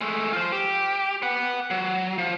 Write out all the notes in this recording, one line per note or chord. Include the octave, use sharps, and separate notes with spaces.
G#3 A3
F4 C5
G4
B4 F#5
F#3
F3